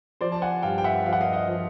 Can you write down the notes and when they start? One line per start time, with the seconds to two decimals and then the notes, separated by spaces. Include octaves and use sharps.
0.21 F3 C5 D5
0.32 A5
0.42 F#5 G#5
0.62 G2 F5 G5
0.78 G5
0.84 E5 F#5
1.05 F3 F5
1.13 F#5
1.21 D#5 F5
1.33 D#5 F5
1.48 F3